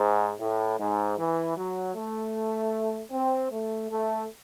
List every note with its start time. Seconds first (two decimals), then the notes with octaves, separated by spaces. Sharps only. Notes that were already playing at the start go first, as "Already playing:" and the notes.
Already playing: G#2
0.40 A2
0.79 G#2
1.19 E3
1.57 F#3
1.96 A3
3.12 C4
3.51 A3
3.90 A3